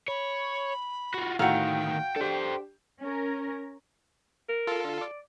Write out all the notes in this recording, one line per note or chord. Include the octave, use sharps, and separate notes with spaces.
C#5 B5
F4 F#4
D2 A2 D#3 F#4 F5 G5 A#5 E6
D4 G4 A4 C5
C#4 A#4
A#4
F4 A4
D3
D5